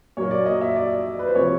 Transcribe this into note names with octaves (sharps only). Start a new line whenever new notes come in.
A#2 F#3 A#3 C#5
D5
D#5
E5
D5
B4
C5
C3 F3 A#3 C#5